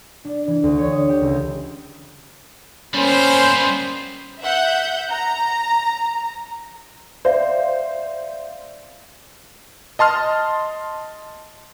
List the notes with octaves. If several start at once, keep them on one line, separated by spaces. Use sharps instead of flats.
D4
E3
D2
C#5
D#6
G4
C#2
G3 A#3 B3 C#4 C5
E5 F#5 G6
A#5
C5 D5 E5 F5
D#5 A5 C6 F6